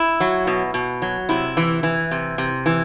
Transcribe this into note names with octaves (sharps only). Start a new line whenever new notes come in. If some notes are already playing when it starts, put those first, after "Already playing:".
Already playing: E4
F#3
B2
B2
F#3
C3 E4
E3
E3
C3
C3
E3